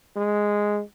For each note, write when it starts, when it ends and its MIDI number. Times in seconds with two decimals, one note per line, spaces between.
0.16 0.81 56